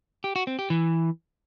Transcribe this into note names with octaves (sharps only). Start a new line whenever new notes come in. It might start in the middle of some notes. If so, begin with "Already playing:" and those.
G4
F#4
C4
G4
E3